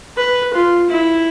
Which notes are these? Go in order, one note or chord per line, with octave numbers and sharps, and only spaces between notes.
B4
F4
E4